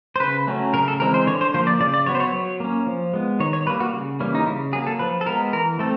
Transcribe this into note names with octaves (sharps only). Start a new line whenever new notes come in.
C5
C#3 B4
F#3 A3 C#4
C#3 A#4
A4
E3 G#3 C4 A#4
C5
D3 C#5
C5
F3 A#3 C5
D5
C#3 D5
D5
F#3 B3 C#5
C5
C#5
F#3
A#3 C#4
F3
G#3 B3
D#3 C#5
C#5
G3 A#3 B4
F#4
C#3
E3 G3 A#3 C#4
D#4
C#3 E4
F#3 A#3 G#4
A4
F3 B4
A4
G#3 B3 A#4
E3 A#4
A3 C4 A4